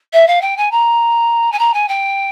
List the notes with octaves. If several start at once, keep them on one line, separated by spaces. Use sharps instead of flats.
E5
F5
G5
G#5
A#5
G#5
A#5
G#5
G5